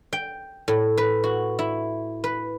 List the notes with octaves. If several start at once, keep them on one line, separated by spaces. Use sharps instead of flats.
G5
A2
B4
F#4
E4
B4